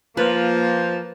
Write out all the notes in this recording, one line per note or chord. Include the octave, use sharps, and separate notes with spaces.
F3 A#3 F4 B4